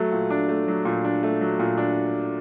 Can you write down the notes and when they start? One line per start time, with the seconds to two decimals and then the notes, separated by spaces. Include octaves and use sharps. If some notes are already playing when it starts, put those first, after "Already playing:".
Already playing: F#3 A3
0.12 A#2
0.30 D4
0.49 A3
0.68 F#3
0.85 A#2
1.04 D4
1.23 A3
1.41 F#3
1.59 A#2
1.78 D4